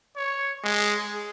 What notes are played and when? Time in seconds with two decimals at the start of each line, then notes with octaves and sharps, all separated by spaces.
0.16 C#5
0.63 G#3
0.99 G#4